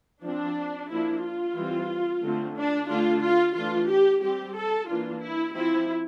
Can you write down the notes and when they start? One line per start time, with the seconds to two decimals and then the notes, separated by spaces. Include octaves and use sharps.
0.24 F3 C4 D4
0.90 F3 A#3 D4 E4
1.23 F4
1.56 E3 G3 C4
2.23 D3 A3 C4
2.56 D4
2.89 D3 A3 D4 F4
3.22 F4
3.56 E3 A3 D4 F4
3.89 G4
4.22 G3 C4 G4
4.56 A4
4.89 E3 A#3 D4 F4
5.22 E4
5.55 F3 C4 E4